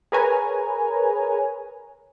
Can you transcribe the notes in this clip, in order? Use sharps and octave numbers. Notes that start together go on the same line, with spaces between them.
G#4 A#4 B4 C#5 G#5 A#5